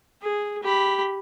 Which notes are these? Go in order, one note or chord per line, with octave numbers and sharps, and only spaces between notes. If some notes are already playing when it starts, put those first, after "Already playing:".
G#4
G4 B5